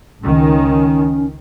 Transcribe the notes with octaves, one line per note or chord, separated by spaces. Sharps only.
C#2 D#3 C#4